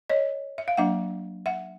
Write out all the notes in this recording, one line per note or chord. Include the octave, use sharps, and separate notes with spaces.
C#5 D#5
E5
F5
F#3 A#3 D4 E5 F#5
E5 F#5